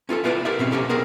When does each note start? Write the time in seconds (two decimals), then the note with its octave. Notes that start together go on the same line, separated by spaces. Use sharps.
0.09 C#4 F4 G4 A4
0.24 E4 F4 B4 C#5 D5
0.45 E4 G4 A#4 B4 D5 E5
0.59 B2 C4 C#4
0.72 C3 A#3 C#4 G4 A4
0.89 B3 C4 G#4 A#4 C5